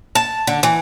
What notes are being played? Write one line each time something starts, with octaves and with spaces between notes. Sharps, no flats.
A5
D3
E3